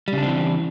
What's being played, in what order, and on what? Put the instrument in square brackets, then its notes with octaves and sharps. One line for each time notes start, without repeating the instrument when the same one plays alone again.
[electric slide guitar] G3
C#3
D4
C4
E3